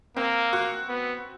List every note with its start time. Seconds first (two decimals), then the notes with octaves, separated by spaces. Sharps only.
0.17 A#3 C4
0.53 F#4
0.88 B3